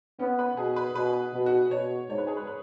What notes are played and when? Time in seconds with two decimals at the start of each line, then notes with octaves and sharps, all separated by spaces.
0.19 B3 C#4
0.39 B4
0.57 B2 G#4
0.76 B4
0.95 B2 B4
1.33 B2
1.46 F#4
1.71 B2 C#5
2.09 G#2 C#5
2.18 B4
2.27 G#4
2.37 B4
2.47 B4